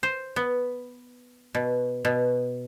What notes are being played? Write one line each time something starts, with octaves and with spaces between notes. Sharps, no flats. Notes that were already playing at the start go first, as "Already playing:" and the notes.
C5
B3
B2
B2